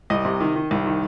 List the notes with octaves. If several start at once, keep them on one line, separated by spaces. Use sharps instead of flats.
C2 D#5
C3
D#3
D#3
C2
D#3